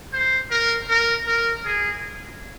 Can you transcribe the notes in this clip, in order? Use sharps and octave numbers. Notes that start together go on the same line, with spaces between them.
C5
A#4
A#4
A#4
G#4